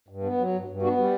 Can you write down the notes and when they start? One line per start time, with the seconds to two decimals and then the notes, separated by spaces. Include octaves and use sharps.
0.08 G2
0.23 B3
0.38 F#3
0.53 G2
0.68 G2
0.82 B3 D4 F#4
0.97 G3